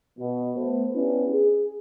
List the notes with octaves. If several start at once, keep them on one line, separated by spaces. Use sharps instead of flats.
B2
A3 B3 C5
B3 C#4 D4 E4 G4 B4
G#4